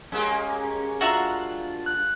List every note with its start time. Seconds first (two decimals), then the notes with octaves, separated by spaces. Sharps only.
0.12 G#3 A#3 C#4 G4
1.01 D4 F4 F#4 E5 F#5 A#5
1.86 F#6